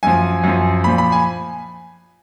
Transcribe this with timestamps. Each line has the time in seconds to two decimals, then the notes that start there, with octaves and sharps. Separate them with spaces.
0.03 F#2 F3 G#5
0.43 F#2 F3
0.84 A#2 F3 B5
0.98 B5
1.12 G#5